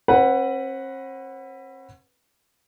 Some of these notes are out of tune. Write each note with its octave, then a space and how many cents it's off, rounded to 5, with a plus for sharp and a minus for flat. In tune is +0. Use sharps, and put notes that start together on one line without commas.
C4 +45 B4 +0 F#5 +0